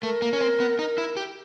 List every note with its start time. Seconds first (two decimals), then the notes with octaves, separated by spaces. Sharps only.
0.03 A3 A#4
0.22 A#3
0.33 C#4
0.41 C4
0.60 B3
0.79 D#4
0.98 E4
1.17 G4